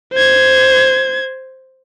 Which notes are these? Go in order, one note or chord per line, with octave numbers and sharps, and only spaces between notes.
C5 G#6